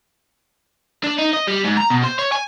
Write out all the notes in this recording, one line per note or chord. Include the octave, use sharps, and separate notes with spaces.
D4
D#4
D#5
G3
G#2
A#5
B2
C5
C#5
G#5